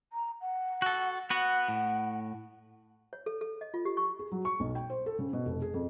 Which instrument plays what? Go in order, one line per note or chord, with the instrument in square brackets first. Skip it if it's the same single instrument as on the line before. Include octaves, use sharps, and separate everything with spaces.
[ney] A#5
F#5
[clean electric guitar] F#4 A4
[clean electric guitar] B3 F#4 [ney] F#5
[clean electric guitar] A2
[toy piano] C#5
A4
A4
D#5
F4
G4
C#6
[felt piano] G#4
F#3
C#6
B1
G5
C5
A4
C#3
B2
F1
G#4
F2